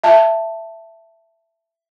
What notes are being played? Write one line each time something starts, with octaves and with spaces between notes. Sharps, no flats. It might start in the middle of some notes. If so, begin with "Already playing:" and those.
E5 A5